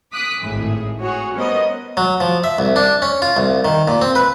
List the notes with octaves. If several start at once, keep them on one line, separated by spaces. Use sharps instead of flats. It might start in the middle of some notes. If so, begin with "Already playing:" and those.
D6 D#6 F#6 B6
G#1 A2 G#4
F#4 G#4 C#5
G3 B3 C#4 A#4 C5 D#5
F#3
F3
E5
C2
D4
C#4
F4
C2
D#3
A#2
C4
B4